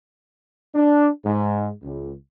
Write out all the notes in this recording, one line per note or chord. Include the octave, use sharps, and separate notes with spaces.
D4
G#2
C#2